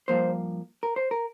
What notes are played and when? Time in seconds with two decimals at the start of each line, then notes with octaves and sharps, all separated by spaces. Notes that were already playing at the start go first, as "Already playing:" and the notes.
0.08 G2 D3 F3 A#3 C5
0.83 A#4
0.96 C5
1.11 A#4